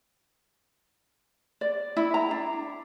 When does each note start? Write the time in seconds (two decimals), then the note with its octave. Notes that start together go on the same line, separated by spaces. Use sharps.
1.61 D5
1.97 E4
2.14 A#5
2.31 D4